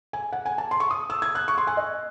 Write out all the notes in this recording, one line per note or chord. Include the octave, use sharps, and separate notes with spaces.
G#5
F#5
G#5
A5
C6
C#6
D#6
E6
G#6
F#6
C#6
C6
G#5
D#5